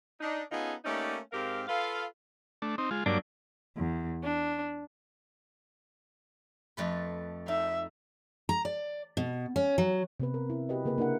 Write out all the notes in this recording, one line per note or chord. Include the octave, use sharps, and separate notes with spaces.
D4 D#4
B3 C#4 D#4 F4 G#4 A4
A3 A#3 C#4 D#4 G4 D5
G#2 C4 G4 A#4 F5
F4 A4 B4 F5
A3 D4
C4 D#4
G#3 F4
G2 F#3 A#3 D4 D6
E2
D4
F2 A3 B4
D#4 E5
A#5
D5
B2
C#4
F#3
C3 B3 B4
A#4
E4
F#4 G4 B4 D#5
C#3 A#3 G#4 B4
A#3 D4 E4 A#4 F#5